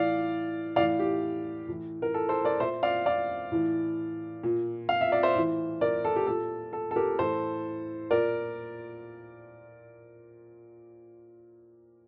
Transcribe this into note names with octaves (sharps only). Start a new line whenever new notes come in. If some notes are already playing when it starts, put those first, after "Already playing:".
Already playing: A2 E3 D5 F5
A2 E3 D5 F5
G4
A2 E3
A#4
A4
A4 C5
A#4 D5
A#2 C5 E5
D5 F5
D5 F5
A2 E3
A#2
F5
E5
D5
C5 E5
A2 E3
A#4 D5
A4
G4
A#2 A4
A4
A4
G4 A#4
A2 E3 A4 C5
A#2 A#4 D5